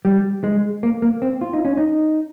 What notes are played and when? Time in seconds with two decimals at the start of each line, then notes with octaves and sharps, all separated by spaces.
0.05 G3
0.44 G#3
0.83 A#3
1.02 A#3
1.22 C4
1.41 F4
1.53 D#4
1.65 C#4
1.77 D#4